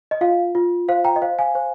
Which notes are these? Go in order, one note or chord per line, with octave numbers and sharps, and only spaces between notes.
D#5
F4 F5
F4
C5 F5
G5 A#5
D#5
C5 F5
F5 G#5
C5